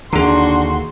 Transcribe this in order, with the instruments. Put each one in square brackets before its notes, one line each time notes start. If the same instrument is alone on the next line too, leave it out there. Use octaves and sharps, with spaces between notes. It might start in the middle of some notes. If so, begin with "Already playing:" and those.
[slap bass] D#2 D3 [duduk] D4 [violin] F#4 C6 [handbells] G#4 A#5